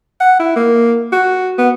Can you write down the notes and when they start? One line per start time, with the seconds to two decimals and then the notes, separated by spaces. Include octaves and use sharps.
0.21 F#5
0.39 E4
0.56 A#3
1.13 F#4
1.58 B3